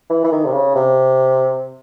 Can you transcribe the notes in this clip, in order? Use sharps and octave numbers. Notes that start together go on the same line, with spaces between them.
E3
E3
D#3
C3
C#3
C3